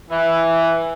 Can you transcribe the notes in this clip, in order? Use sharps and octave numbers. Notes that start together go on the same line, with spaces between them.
E3